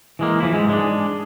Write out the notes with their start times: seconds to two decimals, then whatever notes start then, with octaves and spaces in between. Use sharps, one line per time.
0.19 E3 G#3 A#3
0.40 E3 F3 E4
0.54 G#2 G#3
0.69 G#3 D4